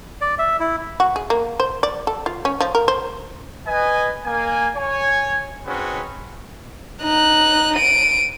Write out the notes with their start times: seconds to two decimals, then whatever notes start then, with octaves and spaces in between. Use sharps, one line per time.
0.21 D5
0.39 E5
0.60 E4
1.00 F#4
1.16 G#4
1.30 A#3
1.60 C5
1.83 D5
2.07 A4
2.26 F4
2.45 C#4
2.60 F3
2.75 A#4
2.88 C5
3.67 B4 D#5 G#5
4.25 A#3 G#5
4.76 C#5 G#5
5.66 C4 C#4 D#4 F#4 G#4 B4
7.01 D#4 F#6
7.76 D7 D#7